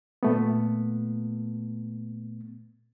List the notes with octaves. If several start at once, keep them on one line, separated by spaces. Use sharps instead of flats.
A#2 A3 B3